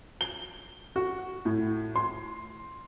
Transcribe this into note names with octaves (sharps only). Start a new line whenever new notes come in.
G7
F#4
A2
C6